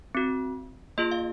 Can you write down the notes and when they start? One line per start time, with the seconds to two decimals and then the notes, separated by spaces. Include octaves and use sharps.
0.15 C4 F#4
0.98 A#3 F4 G#4 D#5
1.11 F5